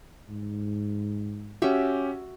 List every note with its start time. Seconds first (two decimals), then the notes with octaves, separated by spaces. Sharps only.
0.29 G#2
1.62 C#4 F#4 G4 E5